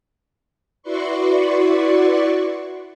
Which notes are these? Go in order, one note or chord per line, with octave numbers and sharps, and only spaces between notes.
E4 F#4 B4 D5 C6 C#6